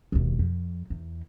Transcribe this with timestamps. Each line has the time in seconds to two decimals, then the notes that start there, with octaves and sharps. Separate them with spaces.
0.12 E1 D#2
0.39 F2
0.90 E2